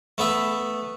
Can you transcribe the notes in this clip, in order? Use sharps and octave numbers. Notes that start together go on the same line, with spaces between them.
A3 B3 E5 B5